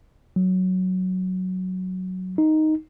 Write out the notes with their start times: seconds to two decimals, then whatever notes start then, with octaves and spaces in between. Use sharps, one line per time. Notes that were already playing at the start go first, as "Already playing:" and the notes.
0.36 F#3
2.38 D#4